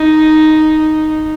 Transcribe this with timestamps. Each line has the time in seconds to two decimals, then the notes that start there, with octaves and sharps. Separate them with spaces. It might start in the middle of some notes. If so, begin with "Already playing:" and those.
Already playing: D#4